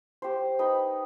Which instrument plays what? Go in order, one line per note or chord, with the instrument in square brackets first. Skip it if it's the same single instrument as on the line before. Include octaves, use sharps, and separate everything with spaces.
[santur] G4 C5
D#4 B4 G5